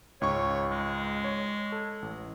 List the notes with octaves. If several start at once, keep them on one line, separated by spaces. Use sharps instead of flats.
C#2 G#2 C#5 C#6
G#3
C#5
A4
A1